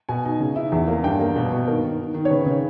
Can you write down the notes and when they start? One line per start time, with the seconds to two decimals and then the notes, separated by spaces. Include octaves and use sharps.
0.09 B2 G#5
0.25 D#4
0.40 C#3
0.56 E4
0.72 E2
0.88 A#3
1.03 G2 G5
1.19 A#3
1.36 B2
1.52 B2
1.67 D#3 A#4
1.83 D#3
1.99 D#3
2.14 D#3
2.25 C#5
2.30 C#3 B4
2.46 C#3